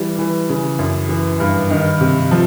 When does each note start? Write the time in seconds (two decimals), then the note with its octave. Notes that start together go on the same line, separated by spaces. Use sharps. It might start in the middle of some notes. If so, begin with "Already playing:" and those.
Already playing: E3 G3
0.19 E3
0.50 C#3
0.79 F#2
1.09 E3
1.40 G2
1.71 D#3
2.01 C3
2.31 F3